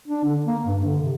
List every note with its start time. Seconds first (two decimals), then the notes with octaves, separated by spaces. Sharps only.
0.08 D4
0.25 D3
0.46 A#3
0.65 G2
0.84 D3
1.02 C3